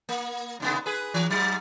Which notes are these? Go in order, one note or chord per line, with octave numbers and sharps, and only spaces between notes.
A#3
D#2 C3 B3
G#4 B4
E3
G#2 F#3